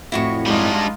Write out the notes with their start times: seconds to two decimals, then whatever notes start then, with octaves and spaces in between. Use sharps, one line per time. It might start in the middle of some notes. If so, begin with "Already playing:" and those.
0.12 F2 A2 C4 E4 F#4 C#6
0.46 G3 G#3 D4 D#4 F4